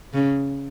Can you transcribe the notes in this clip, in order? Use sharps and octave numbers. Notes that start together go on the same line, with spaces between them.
C#3